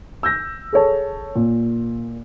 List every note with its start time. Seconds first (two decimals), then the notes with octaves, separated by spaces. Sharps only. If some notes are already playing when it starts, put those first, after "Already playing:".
0.23 E6 G6 A#6
0.73 G#4 A4 C#5 A5
1.36 A#2